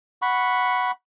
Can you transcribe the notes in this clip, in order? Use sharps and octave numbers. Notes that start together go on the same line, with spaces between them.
F#5 B5 C#6